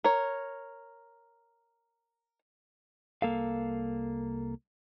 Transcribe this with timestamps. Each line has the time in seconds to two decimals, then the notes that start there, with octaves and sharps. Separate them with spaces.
0.04 A#4 C#5
3.22 C2 F2 A#3 A4 F5